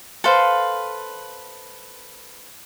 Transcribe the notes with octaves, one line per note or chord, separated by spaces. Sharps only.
A4 B4 C5 F5